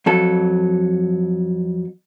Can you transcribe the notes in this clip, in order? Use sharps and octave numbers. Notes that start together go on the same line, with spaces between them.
F2 F#3 A4